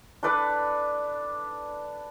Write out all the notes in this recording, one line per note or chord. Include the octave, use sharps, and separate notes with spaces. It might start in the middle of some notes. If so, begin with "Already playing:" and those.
D4 A4 B4 D5